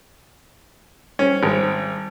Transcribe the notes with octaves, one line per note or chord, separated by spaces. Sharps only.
G3 C#4 C5
G#1